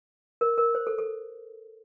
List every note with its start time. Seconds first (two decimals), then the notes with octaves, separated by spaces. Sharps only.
0.41 A#4
0.58 A#4
0.75 C5
0.87 A4
0.98 A4